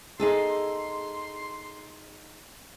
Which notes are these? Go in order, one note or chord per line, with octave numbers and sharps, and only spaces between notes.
D#4 G#4 A4 C6